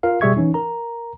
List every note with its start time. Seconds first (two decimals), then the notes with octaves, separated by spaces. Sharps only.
0.03 F4 A#4 F5
0.21 B2 G3 G#4 E5 C#6 G#6
0.37 E3 C#4 D#4
0.54 A#4 A#5